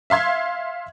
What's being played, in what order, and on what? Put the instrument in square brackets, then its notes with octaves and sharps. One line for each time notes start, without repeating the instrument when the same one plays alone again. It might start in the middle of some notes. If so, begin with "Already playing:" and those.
[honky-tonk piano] E5 F5 C6 G#6